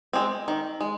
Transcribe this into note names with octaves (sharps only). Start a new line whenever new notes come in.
G#3 C4
D#3
G#3